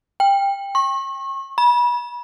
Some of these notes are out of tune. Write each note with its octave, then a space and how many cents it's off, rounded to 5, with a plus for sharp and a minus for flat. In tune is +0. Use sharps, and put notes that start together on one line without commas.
G5 +20
C#6 -35
B5 -35